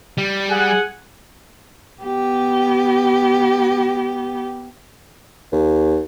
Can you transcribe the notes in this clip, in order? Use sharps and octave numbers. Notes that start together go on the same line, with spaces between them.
G3
G#4 F#5 G#5
B3 G4
D#2